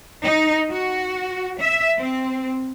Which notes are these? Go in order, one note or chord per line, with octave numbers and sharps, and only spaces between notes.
D#4
F#4
E5
C4